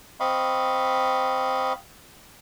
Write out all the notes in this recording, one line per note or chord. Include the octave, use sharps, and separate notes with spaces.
C4 D#5 F5 B5 C#6